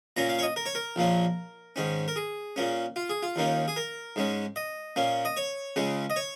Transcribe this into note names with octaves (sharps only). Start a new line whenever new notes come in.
A#2 A#3 C#4 A#5
F5
C#5
D#5
A#4
C#5
A#4
A#1 A#2 A#3 C#4
G#2 D#3 C#4
A#4
G#4
A#2 A#3 C#4
F4
G#4
F4
D#2 D#3 A#3 C#4
G#4
A#4
G#2 G#3 C#4
D#5
A#2 A#3 C#4
D#5
C#5
C#2 C#3 G#3 C#4
D#5
C#5